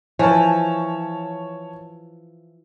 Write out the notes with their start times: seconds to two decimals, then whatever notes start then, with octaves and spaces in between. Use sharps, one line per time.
0.19 E3 F3 C#5 A5